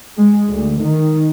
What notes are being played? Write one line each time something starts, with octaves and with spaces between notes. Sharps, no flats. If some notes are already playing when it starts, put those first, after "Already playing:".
G#3
D2
D#3